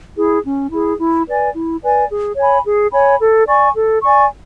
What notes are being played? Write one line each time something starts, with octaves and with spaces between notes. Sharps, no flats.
E4 G#4
C#4
E4 G#4
E4
B4 D5 G#5
E4
B4 D5 G#5
G#4
C#5 G#5 B5
G#4
C#5 G#5 B5
A4
D5 G#5 C#6
A4
D5 G#5 C#6